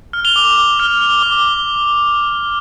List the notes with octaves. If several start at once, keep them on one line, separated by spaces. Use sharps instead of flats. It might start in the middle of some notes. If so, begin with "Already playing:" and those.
F6
F7 G7
D6
D6
F6
F6
D6